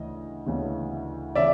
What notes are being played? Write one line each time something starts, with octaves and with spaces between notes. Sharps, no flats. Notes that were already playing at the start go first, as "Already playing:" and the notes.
Already playing: D2 C#3 E3 D#5
D2 C#3 E3
C#3 E3 D5 E5